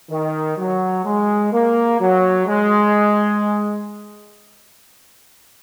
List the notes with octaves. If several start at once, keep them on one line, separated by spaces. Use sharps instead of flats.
D#3
F#3
G#3
A#3
F#3
G#3